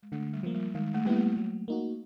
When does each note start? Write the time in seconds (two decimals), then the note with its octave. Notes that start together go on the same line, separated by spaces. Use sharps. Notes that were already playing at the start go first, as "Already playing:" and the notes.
0.03 G#3
0.12 D3 A3
0.33 G3
0.43 F3 A#3
0.54 G3
0.74 D#3 G#3
0.94 A3
1.05 G3 A#3 B3 E4
1.16 A3
1.37 F#3
1.68 A#3 D#4 F#4